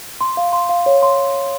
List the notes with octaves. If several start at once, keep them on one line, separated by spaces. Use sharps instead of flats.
C6
F5
C6
F5
C#5
C6